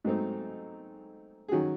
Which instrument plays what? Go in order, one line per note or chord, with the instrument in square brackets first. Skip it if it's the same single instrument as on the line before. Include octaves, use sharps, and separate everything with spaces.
[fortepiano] G#2 F#3 A3 C4 D#4
G#4
D#3 F#3 C#4 F#4